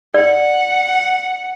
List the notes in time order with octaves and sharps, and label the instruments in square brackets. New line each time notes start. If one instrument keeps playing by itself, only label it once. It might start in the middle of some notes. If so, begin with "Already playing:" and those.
[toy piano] D5 [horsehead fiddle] F#5